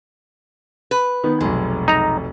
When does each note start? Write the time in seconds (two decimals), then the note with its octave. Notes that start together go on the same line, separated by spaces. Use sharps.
0.91 B4
1.24 D#3 B3
1.40 F1 B1 G#3
1.88 D#4 A#5